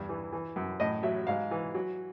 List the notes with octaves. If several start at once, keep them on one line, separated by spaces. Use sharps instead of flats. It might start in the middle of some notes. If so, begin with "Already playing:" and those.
Already playing: E2 G2
E3
E3
F#2
A2 D#5
F#3 E5
G#2 F5
E3
F#3